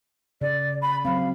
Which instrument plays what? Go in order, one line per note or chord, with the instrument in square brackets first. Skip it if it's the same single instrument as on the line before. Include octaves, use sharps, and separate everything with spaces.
[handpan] C#3 [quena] D5
[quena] B5
[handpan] F#3 C4 [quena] F5